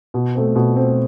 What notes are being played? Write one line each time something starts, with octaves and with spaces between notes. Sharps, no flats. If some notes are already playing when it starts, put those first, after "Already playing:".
B2
A3 C4
B2
A3 C4